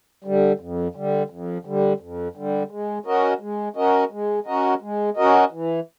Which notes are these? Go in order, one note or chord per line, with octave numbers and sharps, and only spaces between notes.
D3 G3
F2
D3 G3
F2
D3 G3
F2
D3 G3
G#3
C#4 F#4 A#4 D#5
G#3
C#4 F#4 A#4 D#5
G#3
C#4 F#4 A#4 D#5
G#3
C#4 F#4 A#4 D#5
E3